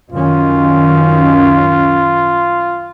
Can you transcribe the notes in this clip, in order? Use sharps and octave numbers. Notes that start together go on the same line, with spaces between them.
F#2 D#3 C#4 F4